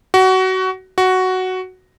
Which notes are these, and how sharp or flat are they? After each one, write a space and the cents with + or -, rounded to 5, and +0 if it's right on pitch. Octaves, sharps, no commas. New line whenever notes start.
F#4 +20
F#4 +5